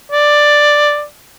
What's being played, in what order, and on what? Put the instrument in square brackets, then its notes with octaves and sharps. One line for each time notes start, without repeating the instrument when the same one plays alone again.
[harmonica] D5